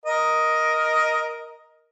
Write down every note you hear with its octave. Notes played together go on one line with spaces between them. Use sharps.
A#4 D#5